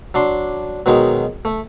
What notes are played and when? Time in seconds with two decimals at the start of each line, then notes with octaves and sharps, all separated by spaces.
0.14 F#3 D4 C6
0.86 B2 D#3 F#3 G#3 D#4
1.45 A3